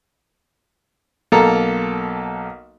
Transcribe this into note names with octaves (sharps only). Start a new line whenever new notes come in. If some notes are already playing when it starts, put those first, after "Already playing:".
B1 A#3 A4 A#5